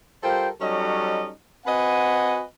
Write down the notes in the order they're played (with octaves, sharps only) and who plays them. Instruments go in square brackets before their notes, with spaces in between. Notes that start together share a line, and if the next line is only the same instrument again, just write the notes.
[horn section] G3 F4 A4 A#4 C5 G5
F#3 G3 C#4 D#4 A4 D#5
C4 F#4 B4 D#5 F#5 G#5